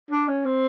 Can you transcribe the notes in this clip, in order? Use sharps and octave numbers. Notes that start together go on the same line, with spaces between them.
D4
C#4
C4